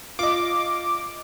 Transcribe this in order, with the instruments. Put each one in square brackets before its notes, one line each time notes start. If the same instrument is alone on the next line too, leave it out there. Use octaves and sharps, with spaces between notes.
[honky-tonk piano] F4 D#5 [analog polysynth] D6